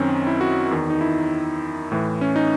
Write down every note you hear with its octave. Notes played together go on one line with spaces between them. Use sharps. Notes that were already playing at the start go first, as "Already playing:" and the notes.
Already playing: F#2 D#3 C4 C#4
E4
F#4
E2 D#3
D#4
E4
A2 E3
C#4
D#4